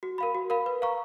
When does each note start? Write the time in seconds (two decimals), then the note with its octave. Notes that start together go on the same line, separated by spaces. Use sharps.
0.03 F#4
0.18 A#4 F5 B5
0.35 F#4
0.50 A#4 F5 B5
0.66 B4
0.82 F5 A#5 C#6